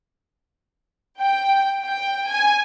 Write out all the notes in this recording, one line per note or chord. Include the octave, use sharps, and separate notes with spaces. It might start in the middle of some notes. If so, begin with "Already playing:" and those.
G5
G5
G#5